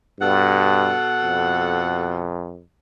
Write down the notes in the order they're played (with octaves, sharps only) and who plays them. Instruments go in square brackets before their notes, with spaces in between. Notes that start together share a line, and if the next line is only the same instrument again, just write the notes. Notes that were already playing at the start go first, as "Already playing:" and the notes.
[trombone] G2 [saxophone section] B2 A4 F#5
[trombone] F2